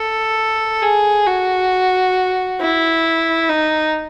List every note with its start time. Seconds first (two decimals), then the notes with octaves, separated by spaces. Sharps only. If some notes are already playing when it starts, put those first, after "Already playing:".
Already playing: A4
0.82 G#4
1.27 F#4
2.60 E4
3.49 D#4